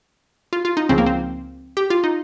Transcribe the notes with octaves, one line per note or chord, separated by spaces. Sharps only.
F4
F4
D#4
C#2 C#3 F3 C4
A#3
C4
G4
F4
D#4